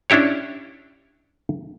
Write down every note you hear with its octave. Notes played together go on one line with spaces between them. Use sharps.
C#4 D4 E4 G4 C#5